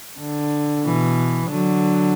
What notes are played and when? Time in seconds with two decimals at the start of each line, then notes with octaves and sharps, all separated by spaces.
0.20 D3
0.85 B2 E3
1.49 D3 F#3